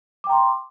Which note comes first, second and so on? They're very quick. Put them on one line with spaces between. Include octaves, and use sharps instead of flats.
D6 G5 A#5 C6